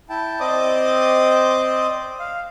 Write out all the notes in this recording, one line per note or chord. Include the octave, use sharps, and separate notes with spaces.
E4 G5 A5
C4 C5 D5 D#5 D6 D#6
F5